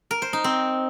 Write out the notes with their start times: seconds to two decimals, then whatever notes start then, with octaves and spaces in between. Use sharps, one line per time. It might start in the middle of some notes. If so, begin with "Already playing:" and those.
0.11 A#4
0.22 C5
0.33 D#4
0.44 C4